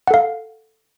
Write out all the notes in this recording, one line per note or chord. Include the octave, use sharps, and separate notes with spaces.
A4 F5 F#5